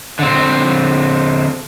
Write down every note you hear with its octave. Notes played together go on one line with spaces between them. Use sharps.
D3 C4